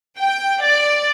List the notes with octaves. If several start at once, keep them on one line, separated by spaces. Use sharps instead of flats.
G5
D5